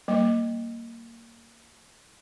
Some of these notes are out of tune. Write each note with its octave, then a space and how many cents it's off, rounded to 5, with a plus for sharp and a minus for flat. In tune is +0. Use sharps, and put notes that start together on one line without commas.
G3 -30 A#3 -10